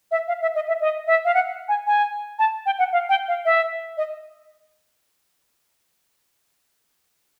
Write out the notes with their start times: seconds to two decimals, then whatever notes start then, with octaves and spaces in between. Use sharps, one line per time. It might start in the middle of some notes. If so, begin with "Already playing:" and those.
0.11 E5
0.28 F5
0.42 E5
0.55 D#5
0.68 E5
0.81 D#5
1.07 E5
1.25 F5
1.34 F#5
1.68 G#5
1.87 G#5
2.39 A5
2.66 G5
2.79 F#5
2.93 F5
3.09 G5
3.28 F5
3.45 E5
3.97 D#5